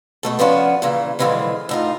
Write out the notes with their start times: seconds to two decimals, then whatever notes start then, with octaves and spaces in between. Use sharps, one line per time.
0.23 B2 A3 A4
0.39 F3 B3 C#4 D4 F#4
0.82 A#2 C#3 E3
1.19 B2 D3 E3 F3 G#3
1.69 A2 D#4 F4